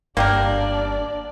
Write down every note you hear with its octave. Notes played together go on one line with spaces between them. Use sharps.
G1 A#3 D4 G4 A#4 D5